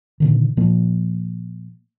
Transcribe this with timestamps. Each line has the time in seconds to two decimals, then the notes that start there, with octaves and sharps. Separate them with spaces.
0.20 A#2 D3 D#3
0.57 A#2 F3 A#3